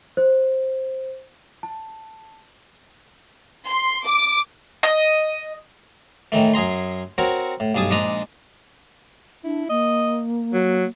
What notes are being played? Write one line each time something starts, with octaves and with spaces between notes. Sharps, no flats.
C5
A5
C6
D6
D#5
A2 D#3 E3 A3
F#2 G#4 A#5 C6
C4 F#4 A#4 C#5
A2
B1 G2 G#4 A5 D#6
A#1 G#3 D4 D#4 A#5 D#6
D4 E4
A#3 D#5
F#3